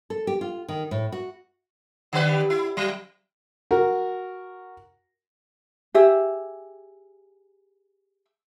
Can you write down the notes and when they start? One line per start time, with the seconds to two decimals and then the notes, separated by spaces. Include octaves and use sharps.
0.10 A4
0.27 G4
0.41 F4
0.69 D#3
0.91 A2
1.12 F#4
2.13 D3 G3 B4
2.50 E4
2.77 F#3
3.71 F#4 A#4
5.94 G4 G#4 E5